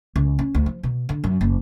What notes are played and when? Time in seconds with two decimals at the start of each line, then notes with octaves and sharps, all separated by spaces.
0.16 C#2
0.39 C#4
0.55 D2
0.66 F3
0.83 B2
1.09 D3
1.24 F#2
1.41 F#1